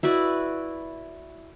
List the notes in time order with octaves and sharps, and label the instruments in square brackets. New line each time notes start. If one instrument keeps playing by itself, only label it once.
[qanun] E4 F#4 B4 D5